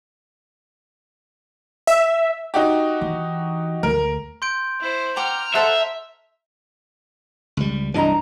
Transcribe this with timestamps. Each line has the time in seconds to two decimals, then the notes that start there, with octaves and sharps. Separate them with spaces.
1.87 E5
2.54 D#4 F#4 G4
3.01 E3
3.83 D2 G#3 A#4
4.42 C6 G6 D7
4.80 E4 C5
5.16 F#5 G5 A#5 D6 F6
5.55 A4 C5 E5 F#5
7.57 C#2 G3
7.94 C2 G2 E3 D4 D#5 A#5